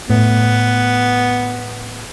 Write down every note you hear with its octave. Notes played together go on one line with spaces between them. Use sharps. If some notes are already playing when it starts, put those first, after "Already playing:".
A2 B3